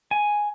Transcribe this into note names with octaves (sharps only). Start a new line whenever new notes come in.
G#5